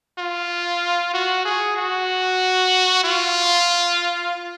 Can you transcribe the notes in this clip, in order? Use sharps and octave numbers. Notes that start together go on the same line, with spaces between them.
F4
F#4
G#4
F#4
F4